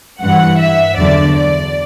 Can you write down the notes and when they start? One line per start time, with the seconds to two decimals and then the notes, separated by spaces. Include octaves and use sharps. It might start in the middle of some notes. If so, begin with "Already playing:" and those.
0.21 G2 E3 F#5
0.58 E5
0.97 E2 D3 F#3 D5
1.36 D5